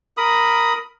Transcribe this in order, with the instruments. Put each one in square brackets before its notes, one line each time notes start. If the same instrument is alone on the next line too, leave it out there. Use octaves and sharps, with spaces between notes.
[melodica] A#4 B5 D#6